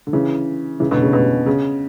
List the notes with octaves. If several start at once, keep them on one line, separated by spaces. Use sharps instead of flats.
D3
C#3 E3
C#3 E3
B2 D3
C#3
B2
C#3